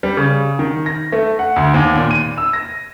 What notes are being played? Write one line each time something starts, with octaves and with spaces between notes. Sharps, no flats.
G3
C#3
D#3
A#6
A3
F#5
D2
D#2
A#2
D#7
E6
A#6